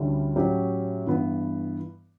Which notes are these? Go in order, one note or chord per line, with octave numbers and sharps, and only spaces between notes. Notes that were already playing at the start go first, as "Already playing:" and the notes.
Already playing: D2 D3 G3 C#4 E4
A2 F#3 C#4 G4
G2 E3 B3